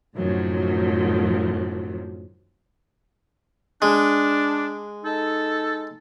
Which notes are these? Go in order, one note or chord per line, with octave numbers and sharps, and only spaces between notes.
F#2 A2 C3 D#3 F3 F#3
G#3 D4
D#4 A4